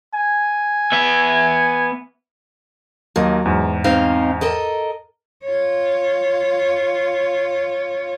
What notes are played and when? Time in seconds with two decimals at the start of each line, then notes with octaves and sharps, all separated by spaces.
0.14 G#5
0.93 B3 E5
3.16 D#2 F#3 A#3 D#5
3.45 E2 G#2
3.84 C4 D#4 F5
4.41 A4 A#4 D#5
5.45 F4 C#5